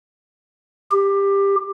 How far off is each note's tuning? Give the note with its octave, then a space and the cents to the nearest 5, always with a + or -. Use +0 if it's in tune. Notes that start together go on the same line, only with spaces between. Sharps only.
G4 +15